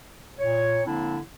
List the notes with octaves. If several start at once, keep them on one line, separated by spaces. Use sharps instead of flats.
A#2 C#5
D3 F3 A#3 C4 D4 E4